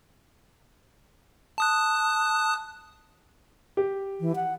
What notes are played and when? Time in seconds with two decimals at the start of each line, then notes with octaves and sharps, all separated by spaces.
1.58 A5 D#6 F#6
3.77 G4
4.20 E3
4.36 F#5